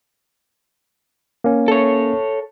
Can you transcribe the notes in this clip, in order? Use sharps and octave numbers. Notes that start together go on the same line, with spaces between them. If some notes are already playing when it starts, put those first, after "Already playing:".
A#3 C#4
A4 C#5